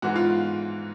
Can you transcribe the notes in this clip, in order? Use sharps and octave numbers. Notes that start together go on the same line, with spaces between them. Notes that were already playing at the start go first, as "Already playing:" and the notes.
G#2 E3 F#4
F4